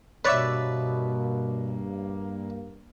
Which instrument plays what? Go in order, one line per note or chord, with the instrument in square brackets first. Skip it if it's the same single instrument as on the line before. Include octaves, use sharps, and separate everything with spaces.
[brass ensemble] G2 A#3 [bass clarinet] B2 [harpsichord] B4 D5 [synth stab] C#5 E5